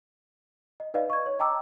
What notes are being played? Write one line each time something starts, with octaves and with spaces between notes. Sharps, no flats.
D#5
D#4 B4 D5 D#5 F5
C#6 G#6
C#5
D#5 G5 A5 A#5 D6 E6